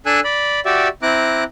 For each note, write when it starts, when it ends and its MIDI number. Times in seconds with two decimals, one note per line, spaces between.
0.06 0.20 62
0.06 0.20 69
0.06 0.20 80
0.06 0.20 88
0.06 0.20 90
0.24 0.60 74
0.24 0.60 83
0.65 0.88 66
0.65 0.88 67
0.65 0.88 74
0.65 0.88 76
1.03 1.44 60
1.03 1.44 64
1.03 1.44 82
1.03 1.44 86
1.03 1.44 90